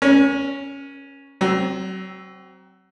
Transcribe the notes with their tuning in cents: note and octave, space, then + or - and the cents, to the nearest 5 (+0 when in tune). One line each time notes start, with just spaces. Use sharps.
C#4 +0 A#4 +40
F#3 +30 C4 +0